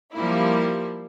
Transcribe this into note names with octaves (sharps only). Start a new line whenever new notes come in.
F3 G3 A#3 E4